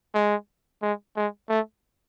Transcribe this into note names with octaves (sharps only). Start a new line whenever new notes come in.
G#3
G#3
G#3
A3